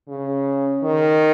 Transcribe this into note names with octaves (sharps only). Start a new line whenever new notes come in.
C#3
D#3